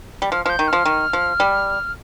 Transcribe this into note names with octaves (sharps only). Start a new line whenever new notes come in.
G3
F3 F6
F3 F6 G6
D#3
F3 F6
D#3
F3
G3